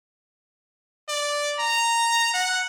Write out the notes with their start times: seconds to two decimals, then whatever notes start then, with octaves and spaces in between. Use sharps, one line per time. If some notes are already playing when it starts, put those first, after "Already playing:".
1.09 D5
1.59 A#5
2.34 F#5